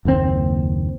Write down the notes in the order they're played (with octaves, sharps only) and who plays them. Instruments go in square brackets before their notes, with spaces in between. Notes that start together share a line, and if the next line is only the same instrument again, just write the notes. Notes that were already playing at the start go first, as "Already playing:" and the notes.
[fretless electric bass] F#1 D#2 A#2 C4